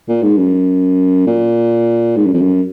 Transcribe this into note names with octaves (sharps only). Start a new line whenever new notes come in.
A#2
G#2
F#2
A#2
G#2
F#2
F2
F#2